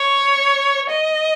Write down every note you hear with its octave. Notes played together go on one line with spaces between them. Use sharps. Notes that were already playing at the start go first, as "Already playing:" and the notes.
Already playing: C#5
D#5